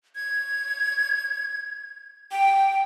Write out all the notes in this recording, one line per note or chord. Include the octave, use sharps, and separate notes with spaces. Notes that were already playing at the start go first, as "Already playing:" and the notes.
G#6
G5